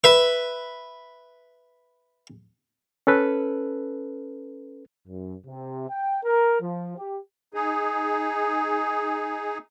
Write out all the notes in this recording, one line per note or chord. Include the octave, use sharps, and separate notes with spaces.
B4 E5
C#4 A4 B4
F#2
C3
G5
A#4
F3
G4
D#4 G#4